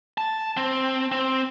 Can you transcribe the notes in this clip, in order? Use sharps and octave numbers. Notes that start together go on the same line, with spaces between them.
A5
C4
C4